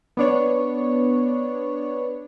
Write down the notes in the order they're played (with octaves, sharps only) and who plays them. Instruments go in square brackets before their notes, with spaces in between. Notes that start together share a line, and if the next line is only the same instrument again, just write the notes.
[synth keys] B3 D4 C#5